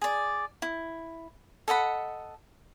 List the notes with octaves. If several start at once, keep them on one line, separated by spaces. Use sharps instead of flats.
G#4 D5
E4
A4 D#5 F#5 B5